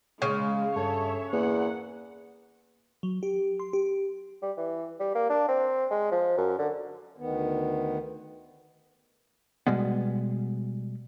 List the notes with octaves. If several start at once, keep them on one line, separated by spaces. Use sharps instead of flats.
C#3 G#3 F5
G2 A4 C#5 E5
E2 A#3 F#5
F#3
G4
C6
G4
G3
E3
G3
A#3
D4
C4
G#3
F3
F#2
D3
D2 D#3 B3
B2 G3 G#3 B3